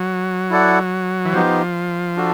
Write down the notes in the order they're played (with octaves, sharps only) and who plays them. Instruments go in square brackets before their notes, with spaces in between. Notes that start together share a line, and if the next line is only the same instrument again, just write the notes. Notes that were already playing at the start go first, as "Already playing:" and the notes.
Already playing: [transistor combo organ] F#3
[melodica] E4 A4 D5 F#5
[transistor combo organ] E3
[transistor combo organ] F3 [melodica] B3 D#4 G4 C5
[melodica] D4 F#4 A4